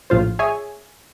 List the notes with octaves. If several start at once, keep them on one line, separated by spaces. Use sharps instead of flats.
A#1 A2 F4 C5
G#4 C#5 E5 G#5